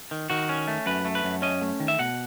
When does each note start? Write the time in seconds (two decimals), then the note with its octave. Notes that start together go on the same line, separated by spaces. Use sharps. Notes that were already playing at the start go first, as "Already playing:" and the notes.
0.11 D#3
0.30 D#3 F#4
0.49 C#4
0.68 A3
0.86 F#2 B4
1.05 A3
1.15 B4
1.24 F#2
1.42 C#4 D#5
1.61 A3
1.80 D#3
1.88 E5
1.99 B2 F#5